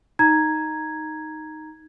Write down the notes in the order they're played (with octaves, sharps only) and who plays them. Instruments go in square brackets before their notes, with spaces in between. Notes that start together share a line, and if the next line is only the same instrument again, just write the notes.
[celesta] D#4 A#5 G#6